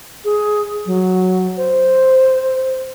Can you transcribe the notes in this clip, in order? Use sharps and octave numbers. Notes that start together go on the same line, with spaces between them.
G#4
F#3
C5